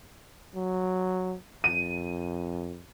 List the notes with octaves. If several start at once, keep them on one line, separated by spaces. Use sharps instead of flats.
F#3
F2 D#7